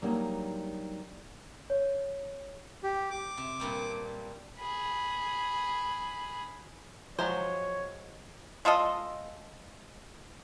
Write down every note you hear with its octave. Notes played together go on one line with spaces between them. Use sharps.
F#3 G3 A#3 D4 D#4
C#5
G4
D6
C3
G2 A#2 G3
G#4 B5
F3 F#3 G#3 C5 C#5
G#3 F4 A4 D#5